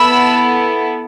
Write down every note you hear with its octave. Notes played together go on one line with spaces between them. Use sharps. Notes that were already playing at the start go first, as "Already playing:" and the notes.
Already playing: B3 E4 A4 B5 E6